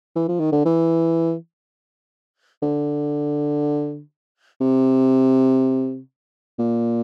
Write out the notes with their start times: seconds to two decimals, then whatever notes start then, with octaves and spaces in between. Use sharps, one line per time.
0.16 E3
0.28 F3
0.40 D#3
0.52 D3
0.65 E3
2.62 D3
4.60 C3
6.58 A#2